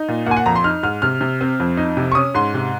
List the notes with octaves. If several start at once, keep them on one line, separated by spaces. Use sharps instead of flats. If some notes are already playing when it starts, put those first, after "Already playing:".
Already playing: D#4
A#2
A#3 F#5 G#5
F#5
F2 A#5
C6
D#4 F6
G#2 F6
C3 F6
C3
C4
F2
D#4
C3
C#6
C#4 D#6
G#2 C6
C3